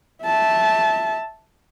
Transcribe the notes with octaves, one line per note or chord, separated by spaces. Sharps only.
E5 A5